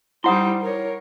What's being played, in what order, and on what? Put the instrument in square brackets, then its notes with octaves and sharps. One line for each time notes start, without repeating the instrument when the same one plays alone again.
[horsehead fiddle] G3 D#4 [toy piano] E4 F#5 D#6 [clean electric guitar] C5 C6
[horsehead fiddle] A#4 C#5